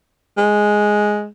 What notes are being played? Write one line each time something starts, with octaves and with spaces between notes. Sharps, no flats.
G#3